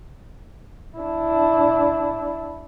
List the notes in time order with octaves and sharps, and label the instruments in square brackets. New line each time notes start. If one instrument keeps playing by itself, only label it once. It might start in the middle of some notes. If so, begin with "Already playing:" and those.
[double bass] D4 E4